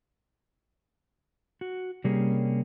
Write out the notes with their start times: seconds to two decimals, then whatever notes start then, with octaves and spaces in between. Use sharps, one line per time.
1.61 F#4
2.04 C3 G3 A#3 C#4 G4 G#4